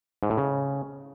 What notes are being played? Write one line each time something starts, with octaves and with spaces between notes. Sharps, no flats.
G#2
A2
C#3